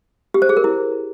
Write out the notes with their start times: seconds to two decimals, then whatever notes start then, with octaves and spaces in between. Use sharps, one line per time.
0.34 G4
0.42 C5
0.49 G#4
0.57 A#4
0.64 E4